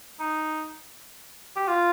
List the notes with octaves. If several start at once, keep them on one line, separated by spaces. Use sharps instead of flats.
D#4
G4
F4